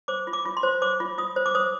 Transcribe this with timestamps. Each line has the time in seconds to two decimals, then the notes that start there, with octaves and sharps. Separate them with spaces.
0.08 C5 D6
0.27 F4
0.33 D6
0.45 F4
0.57 C6
0.63 C5
0.82 C5 D6
1.00 F4
1.18 F4 D#6
1.36 C5
1.46 D6
1.55 C5 D#6